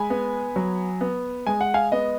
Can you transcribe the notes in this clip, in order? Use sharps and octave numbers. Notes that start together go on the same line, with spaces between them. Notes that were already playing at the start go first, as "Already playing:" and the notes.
Already playing: G#3 G#5 B5
B3
F#3
B3
G#3 G#5
F#5
F5 G#5
B3 D#5